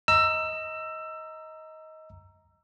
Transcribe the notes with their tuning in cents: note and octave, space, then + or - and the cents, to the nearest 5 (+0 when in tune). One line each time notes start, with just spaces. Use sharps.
D#5 +20 A#5 +0 E6 +20